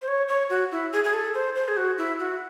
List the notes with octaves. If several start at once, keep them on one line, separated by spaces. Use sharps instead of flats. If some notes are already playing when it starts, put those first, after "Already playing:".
C5
C#5
C#5
F#4
E4
G#4
G#4
A4
C5
C5
G#4
F#4
E4
F#4